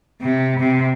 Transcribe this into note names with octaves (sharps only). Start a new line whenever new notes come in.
C3
C3